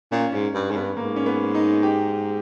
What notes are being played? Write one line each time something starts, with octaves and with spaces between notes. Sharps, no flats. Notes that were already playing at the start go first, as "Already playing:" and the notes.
A#2 C#4
G#2 C#4
G2
G#2
G2 B3
G#2 A#3
C#4
B3
D#4
G4